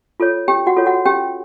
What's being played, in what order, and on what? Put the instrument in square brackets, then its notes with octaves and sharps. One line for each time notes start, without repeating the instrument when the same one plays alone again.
[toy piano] F4 A4 C#5
C#4 G4 G5
F#4 F#5
F4 A4 C#5
F#4 F#5
C#4 G4 G5